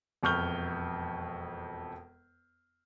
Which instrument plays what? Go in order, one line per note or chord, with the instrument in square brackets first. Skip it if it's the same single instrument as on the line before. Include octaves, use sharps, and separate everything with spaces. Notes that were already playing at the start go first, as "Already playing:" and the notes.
[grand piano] E1 F2 C#6 F6 G6 G7